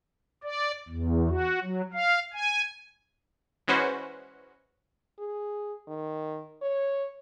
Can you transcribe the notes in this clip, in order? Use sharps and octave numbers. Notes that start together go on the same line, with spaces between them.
D5
E2
F#4
F#3
F5
G#5
E3 G#3 C#4 F#4 B4 C5
G#4
D#3
C#5